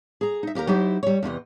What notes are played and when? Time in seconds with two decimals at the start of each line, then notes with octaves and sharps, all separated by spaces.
0.21 G#4 A#5
0.43 D#4 E5
0.55 D#2 G4 A#4 A#5
0.67 F#3 D#4 E4 G4 C5 E5
1.03 G3 C#5
1.23 E2 C3 E3 D#5